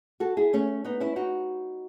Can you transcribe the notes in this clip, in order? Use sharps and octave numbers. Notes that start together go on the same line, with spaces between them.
F#4 A4
E4 G#4
A3 C#4
B3 D#4
C#4 E4
D#4 F#4